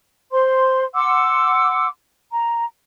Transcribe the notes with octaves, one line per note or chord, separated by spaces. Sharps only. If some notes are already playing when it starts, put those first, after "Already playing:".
C5 C6
F#5 C6 D6 E6
A#5